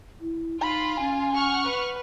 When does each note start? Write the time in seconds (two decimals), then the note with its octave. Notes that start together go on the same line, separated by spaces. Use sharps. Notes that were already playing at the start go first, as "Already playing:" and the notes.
0.21 E4
0.61 D#4 F4 B5
0.99 C#4 G#5
1.35 F#5 C#6 F6
1.65 B4